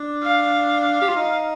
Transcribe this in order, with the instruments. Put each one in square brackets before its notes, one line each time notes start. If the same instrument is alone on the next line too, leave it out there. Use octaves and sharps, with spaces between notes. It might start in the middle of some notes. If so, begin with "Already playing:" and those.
Already playing: [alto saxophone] D4
[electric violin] F5
[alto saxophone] G4
F4
D#4